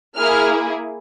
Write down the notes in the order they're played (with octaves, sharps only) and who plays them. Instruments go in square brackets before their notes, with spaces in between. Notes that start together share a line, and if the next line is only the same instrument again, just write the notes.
[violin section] A#3 E4 G#4 F6